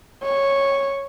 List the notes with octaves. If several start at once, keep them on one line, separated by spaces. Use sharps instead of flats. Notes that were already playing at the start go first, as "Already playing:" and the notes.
C#5